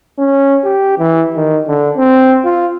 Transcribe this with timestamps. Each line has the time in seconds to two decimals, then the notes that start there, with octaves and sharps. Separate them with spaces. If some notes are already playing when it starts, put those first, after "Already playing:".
0.19 C#4
0.64 G4
0.99 E3
1.36 D#3
1.67 D3
1.97 C4
2.45 F4